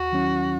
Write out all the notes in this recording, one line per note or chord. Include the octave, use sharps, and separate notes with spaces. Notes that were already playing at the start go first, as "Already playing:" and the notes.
Already playing: D#2 F#4
D#3 F#3 C#4 E4